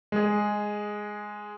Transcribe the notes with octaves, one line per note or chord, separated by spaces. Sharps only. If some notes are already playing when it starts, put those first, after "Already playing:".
G#3 G#4